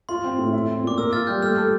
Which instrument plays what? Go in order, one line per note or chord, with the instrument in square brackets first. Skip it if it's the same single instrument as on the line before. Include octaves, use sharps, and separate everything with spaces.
[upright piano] F4 [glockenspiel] C6
[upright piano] C4
A2
E4
C4
[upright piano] A#2 [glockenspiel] D6
[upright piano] A#4 [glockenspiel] E6
[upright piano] F4 [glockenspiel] F6 A6
[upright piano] G3 [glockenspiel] G6
[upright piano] A3 [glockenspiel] F6
[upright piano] A4